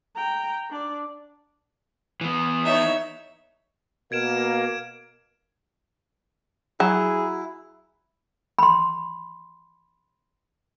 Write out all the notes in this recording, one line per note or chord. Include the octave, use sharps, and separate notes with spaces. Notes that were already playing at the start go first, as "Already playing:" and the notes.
G5 A#5
D4 D5
E3 B3
D#4 C#5 E5
B2 A#3 A#4 G#6 D7 E7
F#3 E4 G#4
B5 C6